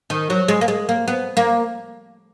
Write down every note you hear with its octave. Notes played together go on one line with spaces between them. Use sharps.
D#3
F#3
G#3
A#3
G#3
A#3
B3
A#3